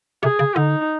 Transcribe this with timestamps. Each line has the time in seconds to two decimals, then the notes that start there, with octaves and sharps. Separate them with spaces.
0.23 C3 G#4
0.39 C#3
0.56 D3 D#4